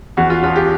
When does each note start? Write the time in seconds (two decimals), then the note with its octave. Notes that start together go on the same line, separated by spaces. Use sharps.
0.17 E2 F#4
0.30 F4
0.43 E1 F4
0.56 G4